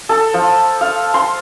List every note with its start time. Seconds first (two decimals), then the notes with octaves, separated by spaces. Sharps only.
0.09 A4
0.34 F3
0.81 F5
1.14 C6